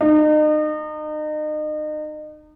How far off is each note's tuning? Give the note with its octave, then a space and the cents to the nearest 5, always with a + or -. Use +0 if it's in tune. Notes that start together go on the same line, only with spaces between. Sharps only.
D#4 -35